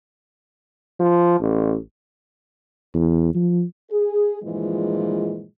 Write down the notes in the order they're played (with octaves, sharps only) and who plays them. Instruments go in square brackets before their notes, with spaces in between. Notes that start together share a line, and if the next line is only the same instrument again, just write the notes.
[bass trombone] F3
A1
[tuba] E2
F3
[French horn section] G#4
G2 A#2 E3 F3 G#3